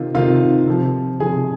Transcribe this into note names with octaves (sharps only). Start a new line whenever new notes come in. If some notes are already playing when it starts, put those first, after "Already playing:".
Already playing: C3 D#3 F4
C3 D#3 F4 F5
C3 F3
C3 F3 G#4 G#5